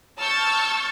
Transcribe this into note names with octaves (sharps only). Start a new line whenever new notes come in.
A5 C#6 E6 F6 G6 A6